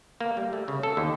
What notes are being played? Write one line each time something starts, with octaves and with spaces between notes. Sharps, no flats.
A#3
G3
A3
C#3
A4
D#2